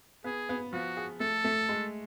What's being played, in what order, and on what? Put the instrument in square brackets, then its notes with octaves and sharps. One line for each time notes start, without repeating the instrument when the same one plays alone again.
[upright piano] B3 [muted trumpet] G#4
[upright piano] B3
[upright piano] F3 [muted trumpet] F#4
[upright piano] G#4
[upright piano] A3 [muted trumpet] A4
[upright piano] A3
G#3